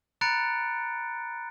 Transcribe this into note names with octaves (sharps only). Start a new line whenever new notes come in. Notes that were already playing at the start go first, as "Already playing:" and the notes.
A#5 B5 F#6 A6 C#7 D7